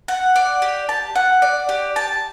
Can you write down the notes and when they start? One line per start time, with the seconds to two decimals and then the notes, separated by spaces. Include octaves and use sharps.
0.08 F#5
0.36 D5
0.62 G4
0.89 A5
1.15 F#5
1.42 D5
1.69 G4
1.96 A5